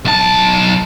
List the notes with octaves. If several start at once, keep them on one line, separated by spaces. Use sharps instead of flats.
B1 A5